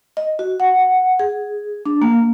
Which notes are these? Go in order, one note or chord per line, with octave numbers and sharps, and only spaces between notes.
D#5
F#4
F#5
G#4
D4
A#3